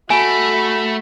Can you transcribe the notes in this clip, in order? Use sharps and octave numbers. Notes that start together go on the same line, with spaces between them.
A3 F#4 G#5 B5